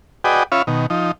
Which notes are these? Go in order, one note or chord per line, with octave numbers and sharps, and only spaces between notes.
F#4 G#4 B4 D5 D#5 G5
C#4 F4 C#5 E5 F5 B5
B2 D#3
F3 D#4